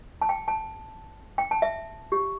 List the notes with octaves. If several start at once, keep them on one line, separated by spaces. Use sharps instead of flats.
A5
G5
A5
G5
A5
E5
G4